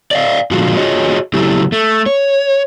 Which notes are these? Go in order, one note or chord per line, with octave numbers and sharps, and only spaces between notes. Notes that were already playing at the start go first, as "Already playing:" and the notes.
D5 D#5 F5
A#2 D3 F3 G#3 F4 F#4
F4 F#4 G#4 C#5 D#5
C#3 F#3 A3 E4 G4
A3
C#5